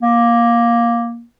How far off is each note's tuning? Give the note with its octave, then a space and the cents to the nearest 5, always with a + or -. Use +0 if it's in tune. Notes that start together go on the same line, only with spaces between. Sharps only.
A#3 +10